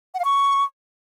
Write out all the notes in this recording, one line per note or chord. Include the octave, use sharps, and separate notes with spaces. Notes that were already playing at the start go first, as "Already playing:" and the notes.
F#5
F5
C#6